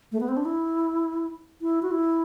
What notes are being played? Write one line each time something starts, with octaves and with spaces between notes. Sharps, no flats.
A3
B3
C4
D4
E4
E4
F#4
E4